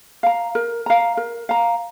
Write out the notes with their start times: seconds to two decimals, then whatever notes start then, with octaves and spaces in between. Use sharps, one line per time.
0.23 F5 A#5
0.55 A#4
0.86 F5 A#5
1.17 A#4
1.49 F5 A#5